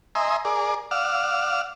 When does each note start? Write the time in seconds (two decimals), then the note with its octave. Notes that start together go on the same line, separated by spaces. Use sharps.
0.15 D#5 E5 G#5 A#5 C6
0.45 G#4 A#4 D5
0.91 D5 F5 F#5 E6 F6